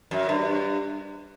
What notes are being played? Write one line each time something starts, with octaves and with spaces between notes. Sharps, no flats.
F#2
G2